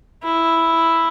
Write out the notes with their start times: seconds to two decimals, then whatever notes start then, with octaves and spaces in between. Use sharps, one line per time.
0.24 E4